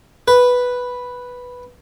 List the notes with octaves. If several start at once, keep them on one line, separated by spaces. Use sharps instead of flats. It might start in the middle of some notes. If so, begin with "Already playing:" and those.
B4